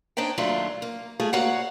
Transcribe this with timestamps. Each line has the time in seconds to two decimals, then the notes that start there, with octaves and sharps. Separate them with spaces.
0.17 D4 D#4 C5 C#5 G5
0.38 D#2 F#3 A3 D4 D#4 F4
0.82 A#3
1.20 G#3 A3 F4 G#4
1.33 D2 A#3 F#4 C#5 F5 F#5